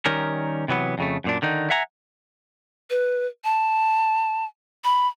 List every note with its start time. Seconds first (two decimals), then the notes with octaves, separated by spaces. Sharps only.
0.06 D#3 G3 C#4 A#4
0.68 C3 E3 F#3 B3
0.98 F2 C#3 A3
1.24 F#2 A#2 D4
1.42 D3 D#3 D#4
1.70 E5 F#5 G#5 A#5
2.90 B4
3.44 A5
4.84 B5